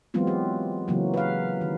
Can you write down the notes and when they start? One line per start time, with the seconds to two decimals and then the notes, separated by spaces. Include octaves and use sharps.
0.14 E3 F#3 G#3 B3 C4 F4
0.27 G4
0.88 C#3 E3 F#3 A#3
1.14 B4 F5
1.61 D#3